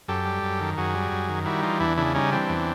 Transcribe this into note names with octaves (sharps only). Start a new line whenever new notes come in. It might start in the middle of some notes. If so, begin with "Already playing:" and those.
F#2 G4 A4
G3
F#2
D#3
F#2 F#4 G#4
G3
F#2
D#3
G3 E4 F#4
E3 D#4 F4
E2 D4 E4
C#3 D4 E4
G3 C#4 D#4
E3 C4 D4
E2